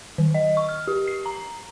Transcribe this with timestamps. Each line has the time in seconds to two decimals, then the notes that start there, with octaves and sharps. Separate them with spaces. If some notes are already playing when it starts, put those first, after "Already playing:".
0.18 D#3
0.34 D#5
0.57 C#6
0.69 F6
0.88 G4
1.08 C7
1.26 A#5